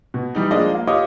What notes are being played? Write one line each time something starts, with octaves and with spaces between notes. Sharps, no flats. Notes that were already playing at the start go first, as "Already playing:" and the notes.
B2
E3 G3 D#4
F3 G#3 A#3 D4 D5 D#5
A#3
F4 G4 C#5 D#5 D6 F6